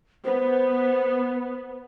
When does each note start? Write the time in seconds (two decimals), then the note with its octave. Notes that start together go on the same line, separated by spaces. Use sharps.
0.25 B3 C5